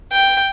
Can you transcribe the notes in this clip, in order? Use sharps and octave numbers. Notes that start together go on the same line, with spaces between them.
G5